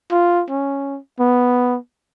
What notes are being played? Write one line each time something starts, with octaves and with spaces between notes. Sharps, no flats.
F4
C#4
B3